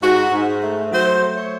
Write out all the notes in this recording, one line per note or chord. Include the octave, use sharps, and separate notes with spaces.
G#2 F#4
G#2
A3
F#3 C5
A3
C#5